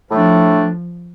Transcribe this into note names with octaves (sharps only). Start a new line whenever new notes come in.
A2 F3 A3 D4